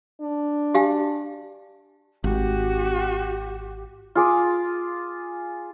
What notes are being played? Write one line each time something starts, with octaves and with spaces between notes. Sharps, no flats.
D4
G4 F5 G#5
G#1 F#4 G4
F4 G#4 D6